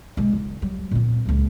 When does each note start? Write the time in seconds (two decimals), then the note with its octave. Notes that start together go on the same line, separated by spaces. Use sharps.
0.17 B1 G#3
0.33 F#1
0.62 F#3 G3
0.91 A#2 C4
1.25 C#2 A#3